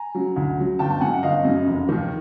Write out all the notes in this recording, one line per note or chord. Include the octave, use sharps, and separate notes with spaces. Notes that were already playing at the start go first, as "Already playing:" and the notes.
Already playing: G#5 A#5
C#3 F#3
D2
C#3 F#3
G1 G5 A5
G5 A5
F#2 C#3 F#5 G#5
F#5
G1 D#5 F5
F#2 C#3
F1
D#2 D#3